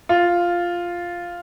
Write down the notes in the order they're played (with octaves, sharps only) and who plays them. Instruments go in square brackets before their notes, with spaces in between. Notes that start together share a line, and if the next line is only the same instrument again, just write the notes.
[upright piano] F4